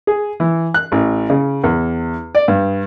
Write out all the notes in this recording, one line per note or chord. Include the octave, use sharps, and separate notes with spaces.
G#4
E3
F#6
A1
C#3
E2
D5
G2